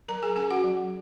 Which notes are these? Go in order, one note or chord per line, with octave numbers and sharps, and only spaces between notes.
F#3 A#4 A#5
G#4 G#5
C#4 G#4 G#5
F#4 F#5
F#3